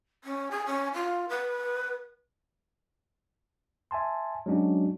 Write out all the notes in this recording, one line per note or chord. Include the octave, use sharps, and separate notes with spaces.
C#4
G#4
C#4
F4
B4
E5 G#5 A5 C6
F#3 G#3 C#4 D4 F#4